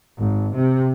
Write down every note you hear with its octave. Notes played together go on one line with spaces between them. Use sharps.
G#1
C3